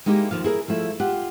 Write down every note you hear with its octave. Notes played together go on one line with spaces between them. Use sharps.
G#3 A#3 D#4 E4 G4
D#2 F3 F5
E4 G#4 A#4
F3 A3 E4
F4 G4 F#5